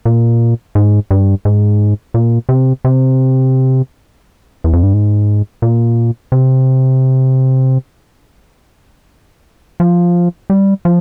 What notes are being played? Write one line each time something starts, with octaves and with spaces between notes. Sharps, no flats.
A#2
G#2
G2
G#2
A#2
C3
C3
E2
F2
G2
G#2
A#2
C3
F3
G3
F3